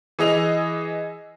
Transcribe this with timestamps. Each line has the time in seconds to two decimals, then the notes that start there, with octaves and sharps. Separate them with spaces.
0.19 E3 G#4 D#5 F7